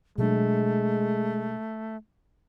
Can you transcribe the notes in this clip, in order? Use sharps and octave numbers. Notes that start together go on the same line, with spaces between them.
B2 F#3 G#3 A3 D4